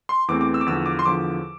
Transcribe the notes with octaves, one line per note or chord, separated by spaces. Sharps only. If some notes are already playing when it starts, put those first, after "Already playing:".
C6
E2 E3 A3 C4 D6
D6
E6
D6
E2 D3 F3 E6
D6
C6
E2 D3 F3 D6